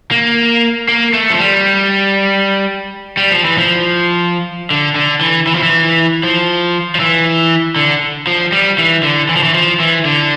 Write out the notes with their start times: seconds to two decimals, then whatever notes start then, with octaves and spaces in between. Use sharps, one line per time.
0.11 A#3
0.88 A#3
1.14 A3
1.30 F3
1.39 G3
3.17 G3
3.31 F3
3.45 E3
3.58 F3
4.71 D3
4.96 D3
5.21 E3
5.47 E3
5.55 F3
5.63 E3
6.23 F3
6.95 F3
7.00 E3
7.76 D3
8.27 F3
8.52 G3
8.78 E3
9.03 D3
9.29 E3
9.36 F3
9.43 E3
9.54 F3
9.80 E3
10.05 D3